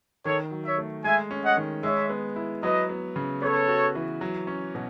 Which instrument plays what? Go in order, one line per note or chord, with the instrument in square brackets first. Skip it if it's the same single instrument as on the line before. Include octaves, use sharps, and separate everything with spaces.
[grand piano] D#3 [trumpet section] A4 C#5
[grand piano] F#3
[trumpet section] C#5 E5
[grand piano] A3
[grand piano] G#3 [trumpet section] E5 G#5
[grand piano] C#4
[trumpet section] D#5 F#5
[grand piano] D#3
[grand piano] G#3 [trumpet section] C#5 E5
[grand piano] B3
E4
[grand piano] F#3 [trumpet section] B4 D#5
[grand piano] B3
C#3
[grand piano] B3 [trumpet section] A4 C#5
[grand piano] F#4
E3
F#3
C#4
B2